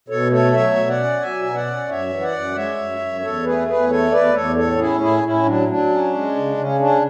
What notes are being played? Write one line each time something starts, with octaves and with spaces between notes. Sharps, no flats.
B2 A4 C#5
A3 A4 C#5
F#3 C#5 E5
B2
D5 F#5
C#4
F#3 E5 G#5
B2 G#5
D5 F#5
C#4
F#2 C#5 E5
E3
D5 F#5
F#2
G#3 C#5 E5
F#2
F#2
E2 A4 C#5
A3 G#4 B4
E2 G#4 B4
A3 A4 C#5
E2 B4 D5
E2 A4 C#5
A2 A4 C#5
C#4 E4 G#4
A2 E4 G#4
A2 C#4 E4
F#3 D4
F#3 D4
C#4
G#3
C#3
C#3 C#4
C#4 D4